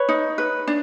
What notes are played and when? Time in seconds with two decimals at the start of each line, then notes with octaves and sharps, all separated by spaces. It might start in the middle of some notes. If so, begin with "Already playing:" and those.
Already playing: B4 C#5
0.09 D#4
0.38 B4
0.67 D4